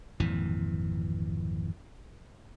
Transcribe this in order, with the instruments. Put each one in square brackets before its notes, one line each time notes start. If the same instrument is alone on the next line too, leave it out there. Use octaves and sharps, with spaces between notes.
[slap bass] G#1 F2 A#2 E3